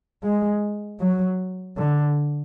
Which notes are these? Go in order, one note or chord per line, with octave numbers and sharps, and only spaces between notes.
G#3
F#3
D3